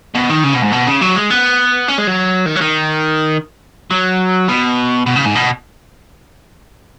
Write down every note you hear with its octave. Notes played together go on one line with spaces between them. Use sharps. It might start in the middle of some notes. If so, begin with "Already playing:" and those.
B2
D#3
C#3
B2
G#2
B2
C#3
F#3
G#3
B3
C#4
G#3
F#3
D#3
F#3
D#3
F#3
B2
B2
C#3
G#2
B2